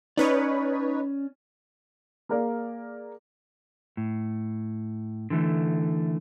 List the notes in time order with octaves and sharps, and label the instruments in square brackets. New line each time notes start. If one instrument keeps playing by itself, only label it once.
[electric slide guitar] C#4 D5 [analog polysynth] D#4 B4 C#5
[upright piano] A#3 G#4 A#4 D5 F5
[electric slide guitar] A2
D3 E3 A3